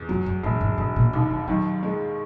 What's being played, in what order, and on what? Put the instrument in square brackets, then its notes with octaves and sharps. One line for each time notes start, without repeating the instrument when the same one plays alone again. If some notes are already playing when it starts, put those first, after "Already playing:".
Already playing: [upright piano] E2
[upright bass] F#2 [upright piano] F#3
[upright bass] F#2
[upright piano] E1 [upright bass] A#2
[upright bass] G#2
[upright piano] E1 [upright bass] G#2
[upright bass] A#2
[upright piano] D#2 [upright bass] B2
[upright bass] D#3
[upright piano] D#3 [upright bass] F#3
[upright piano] G#3